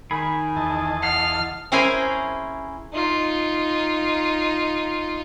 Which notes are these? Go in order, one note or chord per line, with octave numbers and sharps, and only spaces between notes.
D#3 G#4 B5
E2 D#5 A5
F5 F#5 F6
C#4 E4 G#4 A#4 C5 G#5
D#4 F4